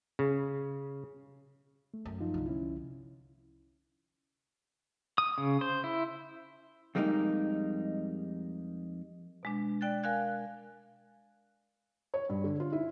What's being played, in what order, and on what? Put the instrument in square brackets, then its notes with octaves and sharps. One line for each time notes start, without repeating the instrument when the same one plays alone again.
[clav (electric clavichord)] C#3
[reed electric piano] A3
[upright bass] F#2
[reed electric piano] F3 D#4 F4
[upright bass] C2 D3
[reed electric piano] C#4 E4
[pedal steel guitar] D#6
C#3
C5
E4
[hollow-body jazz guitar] F2 G3 G#3 A#3 B3 D#4
[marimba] B2 G#3 D4
D5 G5 F#6 A6
A#4 F5 G#5 F#6 G#6
[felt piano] C#5
G2
D3
F4
E4